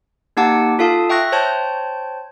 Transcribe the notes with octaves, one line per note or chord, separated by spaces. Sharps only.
A#3 D#4 G4 F#5 A5 D6
F4 A4 F5 A5 D#6
E5 G5 C#6 F#6 A#6
C5 C#5 G5 A5 G6